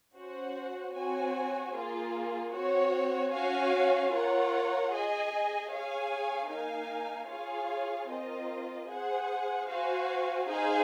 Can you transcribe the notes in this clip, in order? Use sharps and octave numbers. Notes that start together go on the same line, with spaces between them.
C#4 F#4 C5 F#5
C4 F#4 C#5 G#5
A#3 F4 G#4
C4 F#4 C#5
C#4 F#4 C#5 F5 G#5
F4 A#4 C#5 F#5
G#4 D#5 G#5
G#4 C#5 F5 G#5
A#3 D#4 A#4 F5 G#5
F4 G#4 C#5 F5 G#5
C4 F4 A#4 D#5
G#4 C5 F#5
F#4 C5 F5 G#5
D#4 G#4 C5 F5 G#5